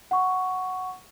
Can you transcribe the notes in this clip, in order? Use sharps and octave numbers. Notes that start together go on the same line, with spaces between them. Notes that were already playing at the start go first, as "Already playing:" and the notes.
F#5 C#6